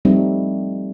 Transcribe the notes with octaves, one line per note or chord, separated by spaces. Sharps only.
F3 G3 A3 C4 D#4